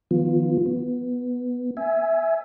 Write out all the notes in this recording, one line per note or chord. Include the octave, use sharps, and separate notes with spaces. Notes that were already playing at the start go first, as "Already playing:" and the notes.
D#3 F3 B3 F4
B3
E5 G#5